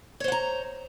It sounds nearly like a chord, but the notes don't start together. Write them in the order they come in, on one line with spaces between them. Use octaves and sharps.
C#5 C5 F#5 A#5